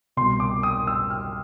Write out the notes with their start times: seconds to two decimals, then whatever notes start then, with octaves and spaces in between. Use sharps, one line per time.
0.17 C2 B2 C6
0.40 D6
0.63 D#6
0.87 E6
1.10 F6